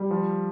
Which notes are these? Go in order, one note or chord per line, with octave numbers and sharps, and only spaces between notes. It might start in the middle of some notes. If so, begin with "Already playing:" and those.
Already playing: G3
F3